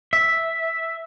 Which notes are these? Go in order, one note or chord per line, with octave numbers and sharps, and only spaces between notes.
E5